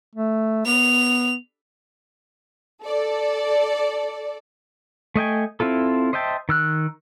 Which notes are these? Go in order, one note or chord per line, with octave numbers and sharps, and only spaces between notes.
A3
B3 F7
A4 D5
A3 D#5 G5 G#5
C4 E4 F4 A4
C5 D#5 E5 G5 A5
D#3 E6 F#6